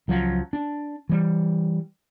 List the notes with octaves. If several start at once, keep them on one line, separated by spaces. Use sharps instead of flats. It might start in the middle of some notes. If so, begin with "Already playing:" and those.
C#2 F3 F#3
D4
E3 G3